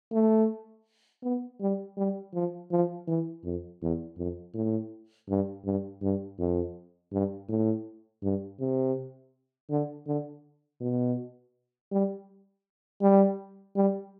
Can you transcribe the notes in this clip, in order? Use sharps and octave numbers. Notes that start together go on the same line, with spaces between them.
A3
B3
G3
G3
F3
F3
E3
F2
E2
F2
A2
G2
G2
G2
F2
G2
A2
G2
C3
D3
D3
B2
G3
G3
G3